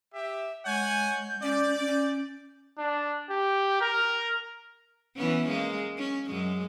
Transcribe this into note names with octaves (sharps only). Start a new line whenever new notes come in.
G4 E5
G#3 C#5 F#5 G#5 G6
C#4 D5
C#4
D4
G4
A#4
E3 B3 C#4
G#3 A#3
C#4
F#2 G#3